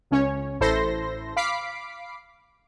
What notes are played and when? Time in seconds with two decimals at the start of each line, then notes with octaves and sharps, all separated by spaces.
0.11 C#2 C#4 C#5
0.60 A1 E4 A4 C5 C6 A#6
1.37 F5 B5 D6 B6 C7 D7